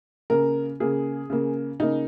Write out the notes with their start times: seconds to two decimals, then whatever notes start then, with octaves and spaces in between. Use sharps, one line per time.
0.30 C#3 A#3 A#4
0.80 C#3 A#3 G#4
1.30 C#3 A#3
1.80 C#3 A#3 D#4